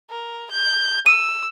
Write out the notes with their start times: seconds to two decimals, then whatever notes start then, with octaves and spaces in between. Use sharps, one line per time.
0.10 A#4
0.51 G6
1.06 E6 D#7